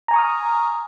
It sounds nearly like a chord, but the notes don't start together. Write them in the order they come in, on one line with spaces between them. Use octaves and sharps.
A#5 G#5 C#6 D#6 F6